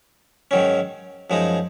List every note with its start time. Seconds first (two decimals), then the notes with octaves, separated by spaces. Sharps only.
0.51 G#2 D#3 F#3 C#4
1.30 F#2 F3 G#3 D#4